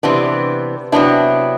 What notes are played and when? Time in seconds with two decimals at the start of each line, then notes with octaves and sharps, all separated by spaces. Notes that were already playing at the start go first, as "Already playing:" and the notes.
0.03 C3 E3 B3 D4
0.92 C3 F#3 B3 D4 E4